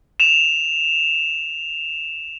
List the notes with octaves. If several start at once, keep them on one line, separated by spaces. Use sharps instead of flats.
E7 F7